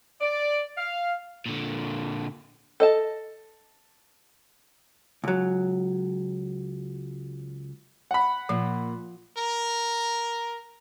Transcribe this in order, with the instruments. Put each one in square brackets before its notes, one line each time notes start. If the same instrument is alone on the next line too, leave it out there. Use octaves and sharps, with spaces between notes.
[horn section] D5
F5
[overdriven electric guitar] A#2 D3
[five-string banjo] A4 D#5 A5
[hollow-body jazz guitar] C#2 F#3
[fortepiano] F#5 B5
[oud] A#2 [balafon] F3
[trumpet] A#4